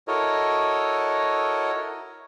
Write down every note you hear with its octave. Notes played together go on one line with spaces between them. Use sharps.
E4 F#4 A4 A#4 C#5 D#5